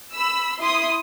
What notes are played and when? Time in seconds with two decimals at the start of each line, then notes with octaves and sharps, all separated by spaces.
0.14 B5 E6
0.59 E4 C6 D#6